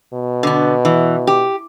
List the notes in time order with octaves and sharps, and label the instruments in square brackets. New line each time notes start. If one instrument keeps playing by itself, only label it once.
[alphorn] B2
[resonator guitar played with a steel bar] D3 B3
E3
G4